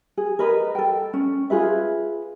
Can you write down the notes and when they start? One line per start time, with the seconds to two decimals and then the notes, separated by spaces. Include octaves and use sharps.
0.17 G#4
0.39 A#4 B4 D#5
0.75 A4 G5
1.13 C#4
1.50 F4 G#4 B4 E5